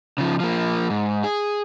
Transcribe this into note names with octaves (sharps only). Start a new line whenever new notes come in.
C#3 F3
F3 A#3
G#2
G#4